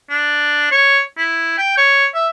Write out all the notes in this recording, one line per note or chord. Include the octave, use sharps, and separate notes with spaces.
D4
C#5
E4
G5
C#5
E5